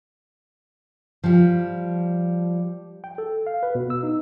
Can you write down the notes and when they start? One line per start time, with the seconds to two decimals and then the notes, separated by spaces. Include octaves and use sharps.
1.24 F3 G3
3.04 G5
3.18 A4
3.47 F5
3.63 B4
3.75 B2
3.90 E6
4.03 D#4